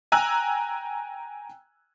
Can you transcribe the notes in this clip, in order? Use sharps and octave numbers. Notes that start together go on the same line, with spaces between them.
G5 G#5 A#5 E6 F#6